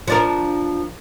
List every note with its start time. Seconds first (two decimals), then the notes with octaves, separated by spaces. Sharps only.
0.08 F3 D4 A#4